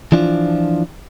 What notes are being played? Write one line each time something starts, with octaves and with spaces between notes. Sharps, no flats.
E3 F3 D4 F4